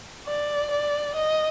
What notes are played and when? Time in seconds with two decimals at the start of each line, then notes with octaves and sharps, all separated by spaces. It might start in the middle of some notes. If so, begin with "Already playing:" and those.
0.27 D5
0.71 D5
1.15 D#5